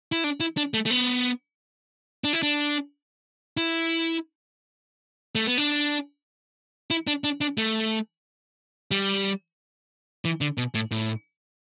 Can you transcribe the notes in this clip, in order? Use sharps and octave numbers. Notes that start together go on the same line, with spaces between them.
E4
D4
E4
D4
A3
A3
B3
D4
E4
D4
E4
A3
B3
D4
E4
D4
D4
D4
A3
G3
E3
D3
B2
A2
A2